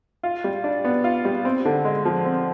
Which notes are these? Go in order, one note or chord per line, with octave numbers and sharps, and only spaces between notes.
F4
G3
D4
B3
F4
G3
C4
D3
G#3
F3
C4